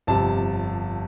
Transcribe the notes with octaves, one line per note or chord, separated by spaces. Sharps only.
G1 F2 C3 G3 A5